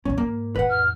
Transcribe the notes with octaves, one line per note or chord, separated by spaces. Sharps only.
A#1 G2 C#4
G#2 A#3
A1 F2 B4 F#5
F6